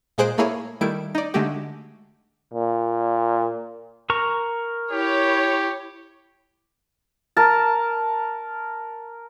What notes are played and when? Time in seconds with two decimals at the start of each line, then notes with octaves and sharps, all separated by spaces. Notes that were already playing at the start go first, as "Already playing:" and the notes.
0.18 A#2 G#3 G#4 C5 F#6 D7
0.38 A3 A#3 E4 G#4 C#5
0.81 D#3 G3 A3 E4 D7
1.15 D#4 D5
1.34 D3 G#3 A3 F#4 G4
2.54 A#2
4.10 A#4 A#5 C#6
4.91 E4 G4 C#5
7.37 A#4 A5